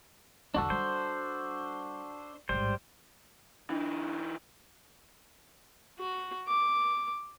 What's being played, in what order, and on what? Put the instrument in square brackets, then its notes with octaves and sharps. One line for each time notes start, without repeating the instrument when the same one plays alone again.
[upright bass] E2 D3 [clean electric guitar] D4 F#4 A4
[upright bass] G3 [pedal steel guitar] C5
[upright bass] A1 G#2 [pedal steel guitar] G3 C5
[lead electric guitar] E3 D#4 [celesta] D4
[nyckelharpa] F#4
D6